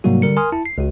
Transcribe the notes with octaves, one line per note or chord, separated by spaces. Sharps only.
G#2 C3 F#3 G3 A#3 F#4
D3 G3 A#4 C#7
A#4 G#5 C6 D#6 F6
E4 A5
C7
C#2 F#4